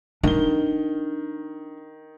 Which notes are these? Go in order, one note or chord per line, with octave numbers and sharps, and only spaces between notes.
D#3 D4 G7